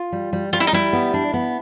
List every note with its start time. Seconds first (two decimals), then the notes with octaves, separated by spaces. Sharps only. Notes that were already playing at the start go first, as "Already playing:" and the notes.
Already playing: F4
0.12 G3
0.33 G3
0.53 G3 F4
0.60 E4
0.67 D#4
0.73 G3 E4
0.93 B3
1.14 D4
1.34 B3